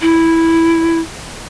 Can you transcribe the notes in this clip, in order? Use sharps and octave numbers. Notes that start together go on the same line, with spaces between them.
E4